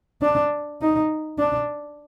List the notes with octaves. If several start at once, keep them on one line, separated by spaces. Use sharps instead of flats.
D4
D#4
D4